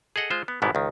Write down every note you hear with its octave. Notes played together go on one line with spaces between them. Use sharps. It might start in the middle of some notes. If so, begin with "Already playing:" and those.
G#4 A4 D#5 F#5
G#3 F4 C5
B3
G#1 G#2 B2 G3 B3 E4
C#2 D#3